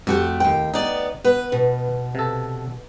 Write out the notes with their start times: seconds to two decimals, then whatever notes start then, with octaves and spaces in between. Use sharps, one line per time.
0.07 F2 A3 F#4 G4
0.40 D#2 G5
0.74 B3 D#4 D5
1.25 B3 B4
1.52 B2
2.15 C3 A4